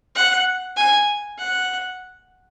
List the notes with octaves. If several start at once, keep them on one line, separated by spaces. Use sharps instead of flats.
F#5
G#5
F#5